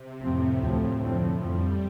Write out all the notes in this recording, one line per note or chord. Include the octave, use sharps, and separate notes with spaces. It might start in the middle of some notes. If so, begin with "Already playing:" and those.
Already playing: C3
F2 A2 F3 C4
D2 C3 F3 A3 C4
F2 D3 F3 A3 C4
F2 F3 G3 C4